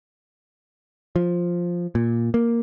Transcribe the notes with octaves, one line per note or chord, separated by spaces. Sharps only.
F3
A#2
A#3